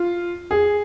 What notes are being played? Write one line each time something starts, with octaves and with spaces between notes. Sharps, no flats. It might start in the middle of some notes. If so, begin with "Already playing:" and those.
Already playing: F4
G#4